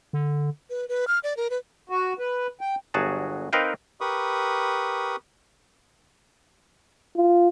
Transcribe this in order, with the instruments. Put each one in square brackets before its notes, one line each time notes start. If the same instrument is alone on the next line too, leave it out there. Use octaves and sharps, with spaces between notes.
[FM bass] D3
[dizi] B4
B4
F6
D5
A#4
B4
[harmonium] F#4
B4
G5
[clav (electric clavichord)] G1 F#3 F#4 G#4 A5
C4 D#4 A#4 B4 F5 G5
[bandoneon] G4 A#4 B4 B5 C#6 D#6
[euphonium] F4